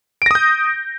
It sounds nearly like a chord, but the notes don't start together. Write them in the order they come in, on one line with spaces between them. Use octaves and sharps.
D7 A#6 D#6 G6